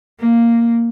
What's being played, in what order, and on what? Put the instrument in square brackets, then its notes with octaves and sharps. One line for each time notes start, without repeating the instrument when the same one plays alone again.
[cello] A#3